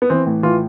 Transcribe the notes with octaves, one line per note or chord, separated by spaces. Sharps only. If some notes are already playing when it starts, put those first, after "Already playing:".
B3
E3 C4
A2
E3 F4